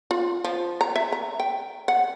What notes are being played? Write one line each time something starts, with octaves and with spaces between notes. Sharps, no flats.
F4
F3
A#5
E5
A#5
G5
F#5